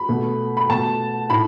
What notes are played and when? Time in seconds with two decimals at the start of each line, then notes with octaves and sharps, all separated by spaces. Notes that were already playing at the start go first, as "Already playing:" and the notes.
Already playing: B5
0.08 B2 A3
0.57 B5
0.69 B2 A3 A5
1.30 A2 B5